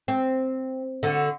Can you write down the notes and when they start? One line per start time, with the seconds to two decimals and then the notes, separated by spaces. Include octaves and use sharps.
0.08 C4
1.03 D3 F#4